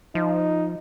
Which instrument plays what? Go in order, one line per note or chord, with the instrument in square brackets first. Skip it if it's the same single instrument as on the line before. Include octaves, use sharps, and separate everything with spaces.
[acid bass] F3 [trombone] D#4